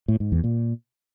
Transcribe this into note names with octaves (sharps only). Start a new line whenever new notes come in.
A2
G#2
E2
A#2